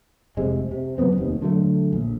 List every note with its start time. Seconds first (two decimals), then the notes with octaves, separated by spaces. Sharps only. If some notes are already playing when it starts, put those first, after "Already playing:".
0.37 F1 C3 G#3
0.71 C3
0.98 C#3 F#3 B3 C4
1.17 F1 D#2
1.42 D3 F#3 A3
1.93 A#1